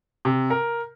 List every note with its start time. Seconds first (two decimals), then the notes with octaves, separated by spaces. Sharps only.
0.25 C3
0.50 A#4